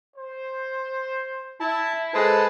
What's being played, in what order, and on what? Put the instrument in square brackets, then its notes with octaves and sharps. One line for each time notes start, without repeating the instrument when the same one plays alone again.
[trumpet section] C5
[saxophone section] E4 [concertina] A5
[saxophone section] G#3 C5 [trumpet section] A4 [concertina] B4 A5